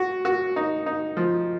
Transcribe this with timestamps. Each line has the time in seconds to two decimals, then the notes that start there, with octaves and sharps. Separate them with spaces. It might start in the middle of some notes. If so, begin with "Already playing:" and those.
Already playing: F#4
0.25 F#4
0.56 D#4
0.86 D#4
1.17 F3